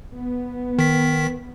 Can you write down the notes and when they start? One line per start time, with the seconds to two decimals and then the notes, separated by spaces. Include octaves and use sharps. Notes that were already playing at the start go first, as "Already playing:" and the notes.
0.13 B3
0.79 D#3 B6